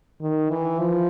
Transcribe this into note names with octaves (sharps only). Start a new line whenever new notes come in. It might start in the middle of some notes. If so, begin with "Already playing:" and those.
D#3
E3
F3